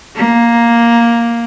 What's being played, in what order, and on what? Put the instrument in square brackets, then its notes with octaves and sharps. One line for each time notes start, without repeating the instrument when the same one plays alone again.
[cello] A#3